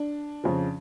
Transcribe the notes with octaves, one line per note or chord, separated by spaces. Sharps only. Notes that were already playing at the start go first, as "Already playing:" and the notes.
Already playing: D4
F2 C#3 F3